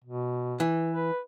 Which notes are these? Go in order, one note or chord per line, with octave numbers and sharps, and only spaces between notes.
B2
E3
B4